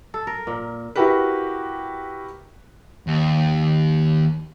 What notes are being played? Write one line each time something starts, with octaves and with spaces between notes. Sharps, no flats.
A4
A#4
A#2
E4 F#4 G4 A#4 B4
D#2